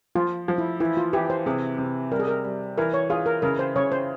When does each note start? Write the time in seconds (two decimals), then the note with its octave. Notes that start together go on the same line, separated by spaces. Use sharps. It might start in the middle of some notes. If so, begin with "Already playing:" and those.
0.15 F3 F4
0.48 F3
0.58 E4
0.80 E3 E4
0.97 F4
1.13 E3 G4
1.30 C5
1.46 C3 G#4
1.78 C3
2.11 G3 A#4
2.20 G#4
2.28 A#4
2.44 G3
2.78 E3 A#4
2.94 C#5
3.10 F4 G#4
3.26 A#4
3.42 C#3 A#4
3.59 C5
3.76 C#3 C#5
3.92 C5